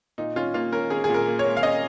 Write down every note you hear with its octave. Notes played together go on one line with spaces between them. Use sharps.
A#2 D#4
C#4 F4
A#3 F4
C#4 A#4
C#4 G#4
A#2 G#4
A#4
A#3
C#5
A#3
F5
C#4 D#5